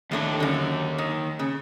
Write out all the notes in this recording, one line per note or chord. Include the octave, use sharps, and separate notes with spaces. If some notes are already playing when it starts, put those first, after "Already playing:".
D#2 A2 A3 D4
F#2 D3
D#3
C#3